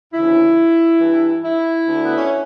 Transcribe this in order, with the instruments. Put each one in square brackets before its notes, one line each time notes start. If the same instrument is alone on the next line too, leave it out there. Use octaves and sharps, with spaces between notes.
[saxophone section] D2 C#3 E3 E4
G2 E3
E4
D2 D3
B3
C#4